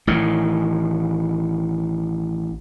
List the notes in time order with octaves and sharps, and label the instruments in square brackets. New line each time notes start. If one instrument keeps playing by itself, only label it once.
[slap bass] A1 A2 D#3